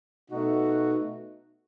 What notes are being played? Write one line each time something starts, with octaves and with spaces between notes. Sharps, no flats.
B2 A3 D#4 F#4